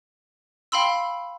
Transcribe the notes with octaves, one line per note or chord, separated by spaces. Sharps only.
F5 G5 B5 C6 E6